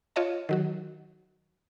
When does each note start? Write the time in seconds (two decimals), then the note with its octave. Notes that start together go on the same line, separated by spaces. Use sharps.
0.16 F4 C#5 D#5 A5
0.49 D#3 F#3 F#4